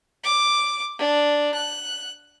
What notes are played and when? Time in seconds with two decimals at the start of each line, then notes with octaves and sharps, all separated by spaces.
0.24 D6
0.98 D4
1.54 F#6